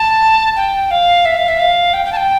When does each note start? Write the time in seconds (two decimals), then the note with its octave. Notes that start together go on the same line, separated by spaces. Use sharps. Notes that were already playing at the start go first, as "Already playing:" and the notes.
Already playing: A5
0.56 G5
0.91 F5
1.25 E5
1.37 F5
1.48 E5
1.59 F5
1.93 G5
2.05 G5
2.12 A5
2.16 G5